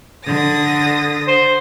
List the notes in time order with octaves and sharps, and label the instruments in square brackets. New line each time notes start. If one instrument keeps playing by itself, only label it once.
[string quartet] D3 D#6 A#6
[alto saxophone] C5